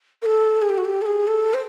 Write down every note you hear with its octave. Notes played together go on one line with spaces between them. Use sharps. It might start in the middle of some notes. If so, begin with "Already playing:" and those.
A#4
A4
G#4
G4
F#4
G4
A4
G#4
A4
C5